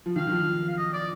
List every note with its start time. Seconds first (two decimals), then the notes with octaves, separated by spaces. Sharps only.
0.06 F3
0.16 D#3 F5
0.27 D#3
0.32 F3
0.69 F5
0.77 D#5
0.93 D5